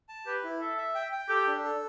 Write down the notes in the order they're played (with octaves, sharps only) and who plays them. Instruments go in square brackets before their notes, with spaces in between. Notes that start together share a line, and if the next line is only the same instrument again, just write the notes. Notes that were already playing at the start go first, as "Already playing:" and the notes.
[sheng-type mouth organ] A5
[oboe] G4 [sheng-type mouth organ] B4
[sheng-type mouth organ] E4
[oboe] A4 [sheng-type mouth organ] E5
[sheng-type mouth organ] E5
G5
G5
[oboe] G4 [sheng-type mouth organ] A4
[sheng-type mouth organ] D4
A4